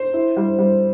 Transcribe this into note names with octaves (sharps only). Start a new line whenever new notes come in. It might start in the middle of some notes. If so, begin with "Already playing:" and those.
Already playing: C5
E4
G3
G3